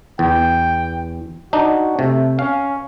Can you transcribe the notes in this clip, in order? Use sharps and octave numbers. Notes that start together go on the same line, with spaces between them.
E2 G5
D4 D#4 F#4
C3 A3
C#4 F5